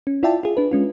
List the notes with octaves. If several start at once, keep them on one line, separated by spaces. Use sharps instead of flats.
C#4
E4 F4 D5 E5 G5 A5
F4 G#4
D4 B4
G#3 C#4 F4